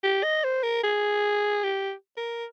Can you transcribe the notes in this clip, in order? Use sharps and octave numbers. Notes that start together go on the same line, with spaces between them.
G4
D#5
C5
A#4
G#4
G4
A#4